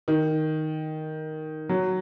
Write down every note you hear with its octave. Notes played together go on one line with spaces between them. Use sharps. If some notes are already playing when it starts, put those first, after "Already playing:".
D#3
F#3